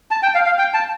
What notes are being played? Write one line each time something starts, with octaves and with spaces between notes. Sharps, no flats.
A5
G5
F5
F5
G5
A5